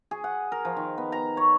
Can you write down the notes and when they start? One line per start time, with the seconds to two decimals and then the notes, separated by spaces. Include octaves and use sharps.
0.11 G#4
0.24 F#5
0.52 A#4
0.65 F3
0.76 D#3
0.98 B3
1.12 A#5
1.37 C#5